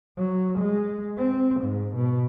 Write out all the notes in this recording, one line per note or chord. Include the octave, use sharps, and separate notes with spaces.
F#3
G#3
C4
G#2
B2